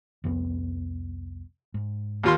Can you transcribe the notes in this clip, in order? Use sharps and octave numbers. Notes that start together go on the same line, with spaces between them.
C2 F2 B3
G#2
D#2 F4 C6